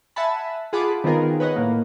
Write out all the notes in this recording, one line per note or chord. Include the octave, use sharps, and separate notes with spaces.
E5 F#5 G#5 A5 B5
F4 G#4 F#5 A5 B5 D6
D#3 B3 C4 F4 G#4 A#4
B4 C#5 D#5 F#5
A2 A#3